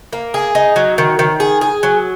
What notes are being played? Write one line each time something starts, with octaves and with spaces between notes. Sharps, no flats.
A#3
G#4
D#4
F#3
D#3
D#3
G#4
G#4
F#3